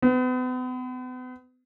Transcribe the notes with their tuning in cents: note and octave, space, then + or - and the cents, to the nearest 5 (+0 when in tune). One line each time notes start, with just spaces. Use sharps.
B3 +40